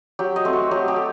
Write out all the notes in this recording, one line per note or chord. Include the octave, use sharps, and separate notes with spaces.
F#3 G4
D#5
A3 C4
F#4
F#3 G4
G4
A3